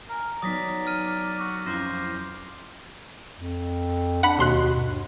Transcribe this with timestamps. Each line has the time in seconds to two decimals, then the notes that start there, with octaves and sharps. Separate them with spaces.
0.09 A#4 G#5 A#5
0.42 F#3 B3 D#4 D5 D#6 A#6 B6
0.87 F6 D#7
1.40 F#4 E6 F#6
1.66 F2 C#4 E4 C5 F5 D6 A#6 E7
3.34 F2
4.23 D4 F#5 B5
4.39 D#2 B2 C6 F#6
4.73 G2